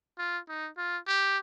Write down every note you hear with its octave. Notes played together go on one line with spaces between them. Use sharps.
F4
D#4
F4
G4